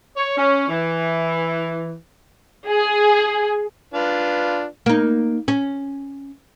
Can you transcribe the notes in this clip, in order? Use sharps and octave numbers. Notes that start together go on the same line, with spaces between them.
C#5
C#4
E3
G#4
D4 F4 B4
A#3 D#4
C#4